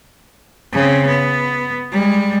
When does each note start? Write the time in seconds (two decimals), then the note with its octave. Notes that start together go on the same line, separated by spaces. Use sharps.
0.73 C#3 C4
1.07 B3
1.92 G3 G#3